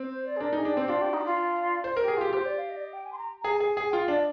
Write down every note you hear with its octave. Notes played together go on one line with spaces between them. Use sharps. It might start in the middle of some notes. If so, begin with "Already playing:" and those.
Already playing: C4
C5
D5
G#4
D4 A#4
D#4 G#4
D4
C4 G4
D4 F4
G4
D#4
G4
F4
C5
G4 A#4
G#4
F4 G4
G4 C5
D5
F5
D#5
D5
D#5
G5
G#5
C6
A#5
G#4 A#5
G#5
G#4
G#4 G#5
F4 G5
F5
D4 D#5